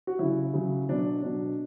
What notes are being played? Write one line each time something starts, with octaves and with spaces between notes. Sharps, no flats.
F#4
C#3 F#3 E4
C#3 F#3
B2 F#3 D4
B2 F#3 D4